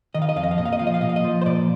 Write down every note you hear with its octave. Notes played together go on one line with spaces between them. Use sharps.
D#3 D#5
F5
D#5
F2 F5
D#5
F5
A#2 D#5
F5
D#5
F3 F5
D#5
F5
A#2 D#5
F5
D#5
F3
C5
A#2 D5